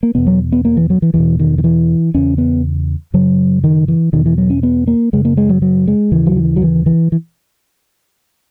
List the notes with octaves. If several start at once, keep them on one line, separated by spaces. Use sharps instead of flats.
A#3
E2 B2 B3
F#3
B3
A#3
E3
F#3
E3
E2 B2 E3
D#3
D#3
E3
E2 C#3 C#4
B3
F#2 C#3 F#3
D#3
E3
E2 B2 D#3
E3
F#3
C#4
B3
A#3
F#2 C#3 G#3
A#3
G#3
F#3
F#3
G#3
D#2 C#3 E3
F#3
E3
F#3
E3
E3
E3